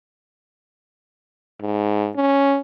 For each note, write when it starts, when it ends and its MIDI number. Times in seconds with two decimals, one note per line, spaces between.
1.61 2.10 44
2.16 2.59 61